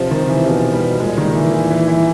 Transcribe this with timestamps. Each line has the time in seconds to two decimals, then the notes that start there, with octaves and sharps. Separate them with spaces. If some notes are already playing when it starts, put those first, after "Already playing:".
Already playing: C3 F3
0.11 D#3
0.29 E3
0.47 B2 F3
0.73 G3
1.00 A#2 G#3
1.18 D#3
1.35 E3
1.53 E3
1.70 E3
1.88 E3